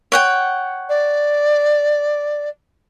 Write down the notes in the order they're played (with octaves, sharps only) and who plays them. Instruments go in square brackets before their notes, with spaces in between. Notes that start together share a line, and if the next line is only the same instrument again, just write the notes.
[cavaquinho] C#5 F#5 G5
[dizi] D5